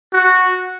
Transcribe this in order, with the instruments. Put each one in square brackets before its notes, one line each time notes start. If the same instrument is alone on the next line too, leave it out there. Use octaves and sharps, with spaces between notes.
[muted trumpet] F#4